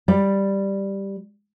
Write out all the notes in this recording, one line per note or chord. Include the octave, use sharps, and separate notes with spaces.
G3 D5